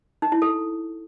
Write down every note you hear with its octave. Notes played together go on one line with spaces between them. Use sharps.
D#4
E4
A4